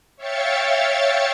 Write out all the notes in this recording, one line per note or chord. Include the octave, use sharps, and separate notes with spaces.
C#5 E5 F5 G5 A6 C#7